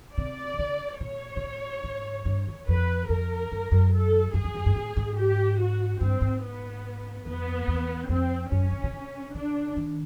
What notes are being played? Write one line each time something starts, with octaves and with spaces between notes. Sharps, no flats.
C3 D5
C#3
A#2 C#5
A#2
A2
G#2
G2
E2
F2 B4
F2 A#4
F#2
F#2
A4
F#2 G#4
F2
F#2
G2
A2
G#2
G4
F#4
G2 C4
G#2
B3
F2 B3
E2
F2 C4
F#2 C#4
C#3
C3
B2
C3
C#3 D4
D#3